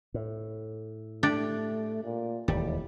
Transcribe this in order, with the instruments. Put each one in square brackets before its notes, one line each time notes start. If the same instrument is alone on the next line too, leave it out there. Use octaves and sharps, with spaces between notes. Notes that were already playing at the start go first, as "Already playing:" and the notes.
[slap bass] A2
[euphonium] A3 [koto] D4 G4 D5
[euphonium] A#2
[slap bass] E1 D#2 [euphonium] A2 [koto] G3